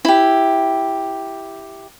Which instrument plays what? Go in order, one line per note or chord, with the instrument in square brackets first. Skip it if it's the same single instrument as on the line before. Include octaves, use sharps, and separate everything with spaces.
[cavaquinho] E4 G4